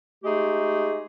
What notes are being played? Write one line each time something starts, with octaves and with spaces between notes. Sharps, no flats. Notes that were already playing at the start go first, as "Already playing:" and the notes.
G#3 A3 D#4 G4 G#4